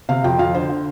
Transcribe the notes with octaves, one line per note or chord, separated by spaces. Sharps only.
C3 F5
F2 G5
F2 F5
D3 C5
D3